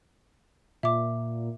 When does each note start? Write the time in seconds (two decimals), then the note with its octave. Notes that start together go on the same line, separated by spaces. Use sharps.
0.83 A#2 E5 D6